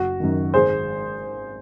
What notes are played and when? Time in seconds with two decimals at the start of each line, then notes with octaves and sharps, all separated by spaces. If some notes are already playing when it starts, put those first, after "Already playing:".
Already playing: F#1 F#4
0.20 F#2 D#3
0.54 G#1 G#4 C5